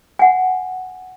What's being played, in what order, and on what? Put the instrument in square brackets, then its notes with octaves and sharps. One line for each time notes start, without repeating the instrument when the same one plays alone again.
[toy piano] F#5 G#5